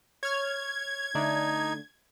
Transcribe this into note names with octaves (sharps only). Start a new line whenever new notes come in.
C#5 F6 G#6
D3 A3 D4 D#4